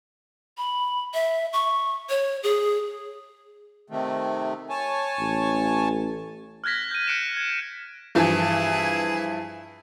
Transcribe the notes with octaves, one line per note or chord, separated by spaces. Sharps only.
B5
E5
C#6
C#5
G#4
C3 D#3 A3
C#5 G#5 A5
A1
F6 F#6 G#6 A#6 B6
G6 D#7
F#6 C#7 D7 E7
G#6
G2 E3 F3 E4 G#4